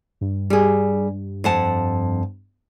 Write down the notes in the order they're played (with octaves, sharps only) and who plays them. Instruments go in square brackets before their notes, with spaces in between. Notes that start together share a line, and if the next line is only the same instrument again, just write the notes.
[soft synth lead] G2
[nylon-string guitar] G3 G#4
F2 F#5 A5